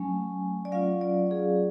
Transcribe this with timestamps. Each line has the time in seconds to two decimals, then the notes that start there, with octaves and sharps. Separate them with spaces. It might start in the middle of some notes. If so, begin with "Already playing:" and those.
Already playing: F#3 A3 C#4 G#5
0.65 D5
0.72 F#3 C#4 F4 F5
1.01 D5
1.31 G#4